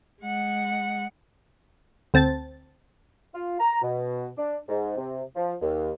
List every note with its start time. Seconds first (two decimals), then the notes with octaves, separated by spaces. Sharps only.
0.22 G#3 F#5
2.14 D2 C4 A5 A6
3.35 F4
3.60 A#5
3.82 B2
4.38 D4
4.69 G#2
4.97 C3
5.36 F3
5.61 D#2